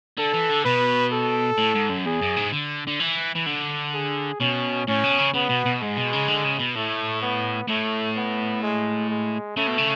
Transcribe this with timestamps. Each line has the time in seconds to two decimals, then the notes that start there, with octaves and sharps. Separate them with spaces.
0.17 D3 A4
0.34 E3
0.49 D3
0.65 B2 B4
1.12 A4
1.58 A2
1.75 G#2
1.90 F#2
2.06 E2 G#4
2.21 F#2
2.36 G#2
2.52 D3
2.87 D3
3.00 E3
3.35 E3
3.46 D3
3.93 G#4
4.40 B2 C#4
4.88 A2 C#4
5.04 B2
5.19 C#3
5.34 C#3 B3
5.49 B2
5.66 B2
5.82 G#2 G#3
5.96 B2
6.13 C#3
6.28 D3
6.44 C#3
6.59 B2
6.75 A2 A3
7.22 B3
7.68 A2 A3
8.16 B3
8.62 G#3
9.10 G#3
9.57 C#3 A3
9.67 B2
9.78 C#3